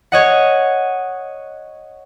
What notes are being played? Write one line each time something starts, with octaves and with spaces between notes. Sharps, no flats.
C#5 D#5 F#5